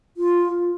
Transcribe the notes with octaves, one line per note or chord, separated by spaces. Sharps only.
F4